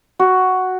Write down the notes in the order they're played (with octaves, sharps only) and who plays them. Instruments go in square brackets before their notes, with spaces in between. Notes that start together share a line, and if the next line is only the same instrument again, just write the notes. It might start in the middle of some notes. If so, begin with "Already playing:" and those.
[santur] F#4